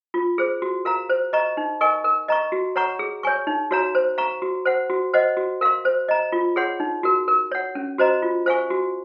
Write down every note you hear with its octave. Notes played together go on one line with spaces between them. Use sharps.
F4
G#4 C5
F#4
A#4 F5 A#5
C5
D#5 A#5 C#6
D#4
A#4 D#5 G#5 C#6
A#4
D#5 A#5 C#6
F#4
C#5 F#5 A#5 C#6
G#4
C#5 G#5 C#6
D#4
F#4 C#5 F5 A#5
C5
F5 A#5 C#6
F#4
C5 F#5
F#4
C5 D#5 F#5
F#4
A#4 F5 C6
C5
D#5 A#5
F4
G#4 C#5 F#5 C6
D#4
F#4 A#4
A#4
C#5 F#5
C#4
F#4 C5 D#5 A#5
F4
C5 F5 G#5 C#6
F#4